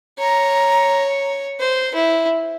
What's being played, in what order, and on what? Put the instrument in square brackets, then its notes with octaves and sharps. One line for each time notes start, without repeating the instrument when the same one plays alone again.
[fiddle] C#5 [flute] A#5
[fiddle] C5
E4